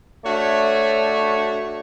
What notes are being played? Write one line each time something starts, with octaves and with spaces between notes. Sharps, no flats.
A3 D4 F#4 C#5